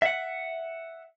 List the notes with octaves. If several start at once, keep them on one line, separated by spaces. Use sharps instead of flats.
E5 F#5